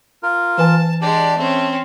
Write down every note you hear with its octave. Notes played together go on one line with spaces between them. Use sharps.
F4 A#4
E3 B4 G#5 A5
G#3 D4 G4 D5
A3 C4 C#4